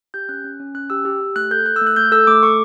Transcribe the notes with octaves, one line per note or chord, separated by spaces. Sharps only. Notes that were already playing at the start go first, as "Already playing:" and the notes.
G4 G6
C#4 F#6
C#4
C#4
C#4 F#6
G4 E6
G4
G4
A3 F#6
A4 G6
A4 F#6
E6
A3
F#6
A3 G6
A4 E6
A3 D6
A4 C#6